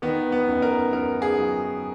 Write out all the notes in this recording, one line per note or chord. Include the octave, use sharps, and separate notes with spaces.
D#3 B3
B3
F#2
A#4
F#2 A#4
G#4
F#3